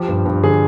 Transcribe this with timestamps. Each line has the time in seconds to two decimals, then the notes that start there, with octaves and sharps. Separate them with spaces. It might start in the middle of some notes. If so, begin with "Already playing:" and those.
Already playing: F3 G4
0.08 G2
0.25 G2
0.43 D3 G#4